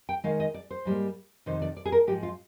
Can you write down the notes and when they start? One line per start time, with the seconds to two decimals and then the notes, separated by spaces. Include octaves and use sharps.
0.09 G5
0.24 D#3 G#3 D#4 F5
0.40 D#5
0.54 D5
0.71 C5
0.85 G#2 G3 A#3
1.46 F2 C3 D#3 C5
1.62 D5
1.77 D5
1.86 G#4
1.92 A#4
2.07 G#2 F3 G#3 G4
2.23 F4